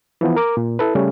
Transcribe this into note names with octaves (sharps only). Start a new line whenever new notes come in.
E3 F3 B3
A#4 D6
A#2
E4 A4 B4
C#3 G3 A3 C#4